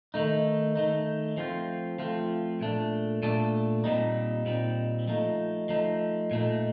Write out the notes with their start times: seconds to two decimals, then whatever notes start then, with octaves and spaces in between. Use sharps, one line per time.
0.14 D#3 A3 D#4
0.75 D#3 A3 D#4
1.37 F3 A3 C4 F4
1.99 F3 A3 C4 F4
2.61 A#2 A3 D4
3.23 A#2 A3 D4
3.84 A#2 G3 C4 D#4
4.46 A#2 G3 C4 D#4
5.08 F3 A3 D#4
5.69 F3 A3 D#4
6.31 A#2 A3 D#4